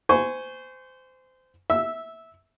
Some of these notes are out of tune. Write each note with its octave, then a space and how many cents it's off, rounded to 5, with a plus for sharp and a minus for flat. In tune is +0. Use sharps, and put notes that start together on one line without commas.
C5 -25 G#5 +0 C#6 +0
E5 -15 E6 +0